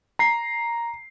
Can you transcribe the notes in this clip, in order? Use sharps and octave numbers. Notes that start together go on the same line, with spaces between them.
A#5 C7